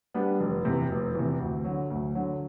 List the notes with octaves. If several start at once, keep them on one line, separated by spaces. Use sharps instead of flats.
G3 B3 D4 G4
F1
E2 C3
F1
E2 C3
D2
D3 F#3
D2
D3 F#3